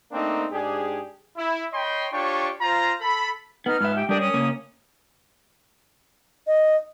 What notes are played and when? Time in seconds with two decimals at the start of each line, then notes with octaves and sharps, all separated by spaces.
0.12 A3 A#3 C4 D4 D#4
0.52 G#2 D4 G4 G#4
1.37 E4
1.73 C#5 D#5 G5 B5 C6
2.12 D4 F4 G4 C#5 G5 C#6
2.61 F4 C5 A#5
3.01 A4 B5
3.66 B3 D#4 F6
3.81 G#2 B4 E5 F6
3.95 G4 G5
4.09 G3 D4 G4 A#4 D#6
4.21 C#4 D#6
4.34 C#3 A#3
6.47 D#5